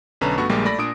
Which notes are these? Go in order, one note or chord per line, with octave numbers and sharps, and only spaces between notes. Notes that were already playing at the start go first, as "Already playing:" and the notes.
B1 D3 C#4 B4 A5 A#5
G2 A3 B3 F#4 C#6
A#1 G3 G#3 A#3 G4
A3 D5 B5 A#6
A#2 D4 D#6 D7